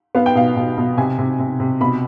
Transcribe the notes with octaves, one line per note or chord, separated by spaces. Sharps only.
B3 F5
G5
B2 F5
B2
B2
C3 G#5
C3
C3
C3
B2 B5